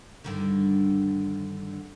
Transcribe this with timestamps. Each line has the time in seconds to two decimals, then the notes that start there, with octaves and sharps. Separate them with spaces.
0.24 G2 D3 D#3